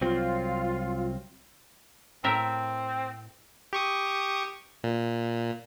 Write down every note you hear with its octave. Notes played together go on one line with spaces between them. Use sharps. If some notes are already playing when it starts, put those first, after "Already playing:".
C2 F#3 C4 F4
A2 C4 A#4 E5
G4 C#6 D#6
A#2